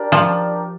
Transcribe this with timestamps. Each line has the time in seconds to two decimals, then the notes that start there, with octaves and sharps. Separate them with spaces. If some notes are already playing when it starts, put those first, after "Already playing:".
Already playing: D4 G4 A#4 D5
0.12 F3